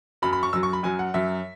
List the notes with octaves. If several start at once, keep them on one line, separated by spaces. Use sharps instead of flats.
F#2 F#3 B5
B5
C#6
F#2 F#3 E6
C#6
B5
F#2 F#3 G#5
F#5
F#2 F#3 E5